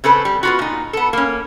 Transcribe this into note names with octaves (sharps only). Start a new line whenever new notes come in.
C#3 C4 A4 B4
G3
B3 F4 F#4
A#2 D#4
B3 A4
A#3 C#4